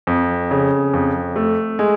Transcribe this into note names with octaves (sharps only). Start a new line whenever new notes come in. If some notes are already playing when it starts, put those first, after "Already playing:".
F2
C#3
F2
A3
G#3